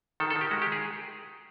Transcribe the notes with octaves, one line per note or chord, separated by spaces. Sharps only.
D#3 A4
A4
D#3
G4
G#3 F#4
G4
G#4